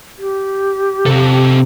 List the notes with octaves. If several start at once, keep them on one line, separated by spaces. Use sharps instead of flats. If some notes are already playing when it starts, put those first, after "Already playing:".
G4
C3 C4 A4